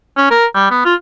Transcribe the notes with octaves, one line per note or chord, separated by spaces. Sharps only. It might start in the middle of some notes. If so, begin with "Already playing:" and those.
C#4
A#4
G3
B3
F4